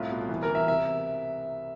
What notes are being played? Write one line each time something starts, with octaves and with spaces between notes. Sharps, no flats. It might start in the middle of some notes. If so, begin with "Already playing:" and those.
Already playing: C2 A2 F4
B2
E3
A#4
E3
E5
C3 E5